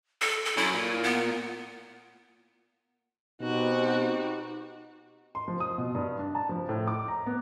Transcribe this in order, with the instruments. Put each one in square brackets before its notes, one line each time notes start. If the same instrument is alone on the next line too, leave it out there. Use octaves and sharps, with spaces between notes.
[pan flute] A4
A4
[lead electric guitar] F#2 C#4 [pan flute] E4
[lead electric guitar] A#2
[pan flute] B3
[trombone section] B2 C4 [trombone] D#4 [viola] F#4 G4
[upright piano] C6
F3
D#6
B2
G2
D4
A5
F3
A2
D6
A#5
B3